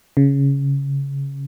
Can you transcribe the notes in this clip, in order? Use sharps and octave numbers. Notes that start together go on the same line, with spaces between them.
C#3